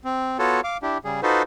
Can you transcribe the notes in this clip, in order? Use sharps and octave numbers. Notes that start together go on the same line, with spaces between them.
C4
B3 F4 F#4 A4 C#5
F5 D6
D4 E4 G4
C#3 G3 G#4
D#4 F4 F#4 A4 B4 C5